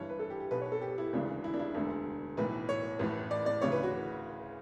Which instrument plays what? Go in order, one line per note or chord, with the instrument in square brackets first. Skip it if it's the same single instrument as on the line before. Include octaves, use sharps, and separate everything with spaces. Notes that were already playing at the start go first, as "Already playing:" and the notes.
Already playing: [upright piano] G1 G2 E3 C#5
B4
A4
G4
G4
B1 B2 B4
C#5
A4
G4
E4
E1 D2 C#3 E3 D4
E4
D4
E4
E1 D2 D3
B1 A2 E3 B4
C#5
A1 A2 E3
D5
D5
D2 C#3 E3 C#5
B4
F#4